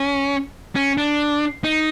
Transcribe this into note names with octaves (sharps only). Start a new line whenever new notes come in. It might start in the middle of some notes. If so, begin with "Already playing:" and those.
Already playing: C#4
C#4
D4
D#4